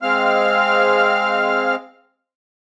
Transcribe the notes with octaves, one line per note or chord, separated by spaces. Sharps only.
G#3 C4 F5 F6